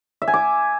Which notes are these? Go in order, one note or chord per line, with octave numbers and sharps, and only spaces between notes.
E5
G#5
D6